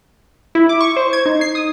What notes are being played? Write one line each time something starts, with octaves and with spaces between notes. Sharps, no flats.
E4
D6
C#6
C5
G#6
D#4
C7
D#6